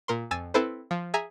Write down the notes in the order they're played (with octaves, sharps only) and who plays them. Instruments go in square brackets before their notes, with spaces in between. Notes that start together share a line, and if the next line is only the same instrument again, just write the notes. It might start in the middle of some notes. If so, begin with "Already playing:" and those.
[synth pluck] A#2 A#4 C6
F2 G#5 E6 A6
C4 E4 A4 B4 C5
F3
G#4 E5 G#5 A#5